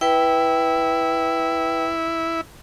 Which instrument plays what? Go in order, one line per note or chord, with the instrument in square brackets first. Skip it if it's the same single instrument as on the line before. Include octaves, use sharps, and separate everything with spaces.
[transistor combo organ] E4 [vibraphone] B4 G5